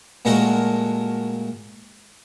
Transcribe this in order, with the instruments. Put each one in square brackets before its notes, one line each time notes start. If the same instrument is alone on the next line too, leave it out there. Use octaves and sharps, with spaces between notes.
[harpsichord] A#2 G#3 A3 F#4 A#4